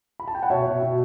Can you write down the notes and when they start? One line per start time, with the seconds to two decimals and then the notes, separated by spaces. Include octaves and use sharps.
0.20 B5
0.28 A5
0.35 G5
0.43 F#5
0.50 B2 C#5 E5
0.66 B2
0.83 B2